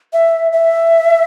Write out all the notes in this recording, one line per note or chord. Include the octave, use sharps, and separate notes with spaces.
E5
E5